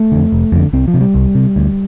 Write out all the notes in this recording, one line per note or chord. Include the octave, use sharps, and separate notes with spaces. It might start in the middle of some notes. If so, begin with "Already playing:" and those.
Already playing: A3
F2 D3
F1
F2 D3
C2 C4
F3
C3
G3
C2
C3
D2